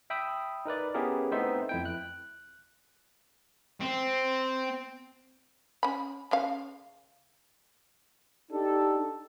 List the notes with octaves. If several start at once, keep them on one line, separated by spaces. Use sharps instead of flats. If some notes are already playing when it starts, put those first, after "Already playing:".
E5 G5 B5 D#6 E6
D#4 A#4 B4 D5
B3 C#4 E4 G4 G#4 A#4
A3 B3 C4 D#4 C5 E5
F2 E4 G5
F#6
C4
C#4 B5
C#3 C#4 F5
D4 D#4 G4 A4